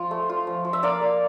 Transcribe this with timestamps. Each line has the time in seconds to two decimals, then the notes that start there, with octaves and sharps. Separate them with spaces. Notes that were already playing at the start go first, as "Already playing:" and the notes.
Already playing: F3 F4
0.11 A3
0.29 F4
0.47 F3
0.65 F3
0.73 E5
0.83 A#3 D5 F5
1.01 A#3